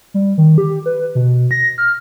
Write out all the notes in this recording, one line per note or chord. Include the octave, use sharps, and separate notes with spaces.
G3
D#3
G4
B4
B2
A#6
F6